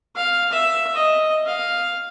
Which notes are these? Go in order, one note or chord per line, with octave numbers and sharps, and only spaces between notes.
F5
E5
D#5
F5